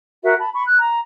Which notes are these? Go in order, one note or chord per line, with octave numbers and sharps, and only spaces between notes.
F#4 A#4 E5
A5 B5
B5 C#6
F#6
A#5